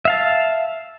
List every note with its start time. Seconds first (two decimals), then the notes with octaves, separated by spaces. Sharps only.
0.05 E5 F5 A5